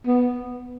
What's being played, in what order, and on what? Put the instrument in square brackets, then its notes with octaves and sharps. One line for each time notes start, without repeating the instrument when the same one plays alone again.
[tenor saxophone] B3